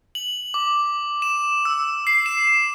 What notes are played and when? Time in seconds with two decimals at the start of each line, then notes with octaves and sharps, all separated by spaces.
0.15 F#7
0.54 D6
1.22 E7
1.65 E6
2.07 C7
2.26 E7